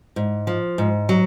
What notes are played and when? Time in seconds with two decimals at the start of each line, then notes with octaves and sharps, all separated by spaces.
0.16 G#2
0.47 F3
0.78 G#2
1.09 F#3